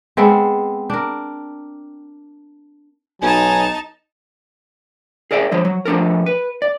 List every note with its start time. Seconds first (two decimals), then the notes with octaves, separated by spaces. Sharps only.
0.17 G#3 B3 C4 A4
0.90 D4 A#4
3.22 B1 F#3 D#4 G#5 A5
5.31 G#4 A#4 D5 E5 G5
5.52 D3 F3 C5 C#5
5.65 F#3
5.86 F3 A3 D4 A4 A#4
6.26 B4
6.62 D5